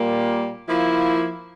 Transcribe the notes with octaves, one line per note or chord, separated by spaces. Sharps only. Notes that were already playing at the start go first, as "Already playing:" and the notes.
Already playing: A#2 G3 A#3
F3 A#3 E4